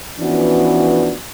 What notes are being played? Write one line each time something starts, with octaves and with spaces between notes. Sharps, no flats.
E3 F3 B3 C#4 D4 F#4